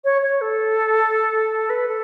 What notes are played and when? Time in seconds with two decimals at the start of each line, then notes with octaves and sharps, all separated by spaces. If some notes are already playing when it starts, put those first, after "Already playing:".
0.04 C#5
0.22 C#5
0.41 A4
1.70 B4
1.88 A4